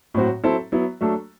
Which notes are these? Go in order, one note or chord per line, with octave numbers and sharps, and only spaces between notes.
A2 F#3 C4 F#4
F#3 C4 E4 A4
F#3 B3 E4
F#3 A3 D4 A4